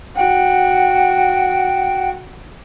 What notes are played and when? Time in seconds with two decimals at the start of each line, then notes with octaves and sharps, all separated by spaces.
0.16 F#4 G5